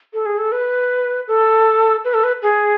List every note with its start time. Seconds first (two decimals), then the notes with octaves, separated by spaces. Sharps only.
0.14 A4
0.26 G#4
0.38 A4
0.52 B4
1.28 A4
2.05 B4
2.14 A4
2.24 B4
2.42 G#4